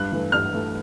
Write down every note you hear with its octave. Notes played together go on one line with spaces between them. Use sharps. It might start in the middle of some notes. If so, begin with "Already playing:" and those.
Already playing: G2 F#6
E3 A3
G2 F6
E3 A3